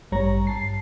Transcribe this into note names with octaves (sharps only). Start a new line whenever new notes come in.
A1 G2 G3 C#5 A#5
G2 A5 C7